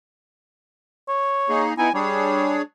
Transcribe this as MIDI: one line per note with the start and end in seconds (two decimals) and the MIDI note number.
1.08 1.63 73
1.49 1.74 58
1.49 1.74 63
1.49 1.74 68
1.78 1.90 59
1.78 1.90 63
1.78 1.90 64
1.78 1.90 80
1.94 2.59 55
1.94 2.62 62
1.94 2.62 68
1.94 2.62 73